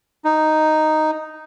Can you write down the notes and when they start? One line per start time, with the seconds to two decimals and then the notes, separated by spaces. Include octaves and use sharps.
0.24 D#4